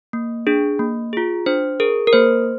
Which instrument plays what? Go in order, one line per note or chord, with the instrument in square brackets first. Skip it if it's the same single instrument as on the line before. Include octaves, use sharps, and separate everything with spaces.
[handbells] A#3
D4 G#4
A#3
F4 G#4
D4 C5
G#4 A#4
A#4
A#3 C5